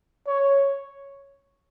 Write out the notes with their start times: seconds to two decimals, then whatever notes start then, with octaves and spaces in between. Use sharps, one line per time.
0.27 C#5